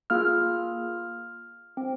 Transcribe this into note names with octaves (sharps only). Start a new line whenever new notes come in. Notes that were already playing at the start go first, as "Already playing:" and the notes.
A#3 F4 G#4 F6
C4